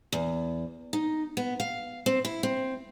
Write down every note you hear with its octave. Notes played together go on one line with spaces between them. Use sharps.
E2
D#4
B3
F5
C4
E4
C4